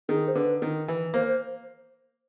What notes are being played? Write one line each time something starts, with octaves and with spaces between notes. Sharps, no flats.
D#3 G#4
C5
D3 B4
D#3
E3
A#3 C5
C5